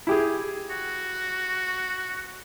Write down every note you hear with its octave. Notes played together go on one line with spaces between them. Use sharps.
E4 G4 G#4
F#4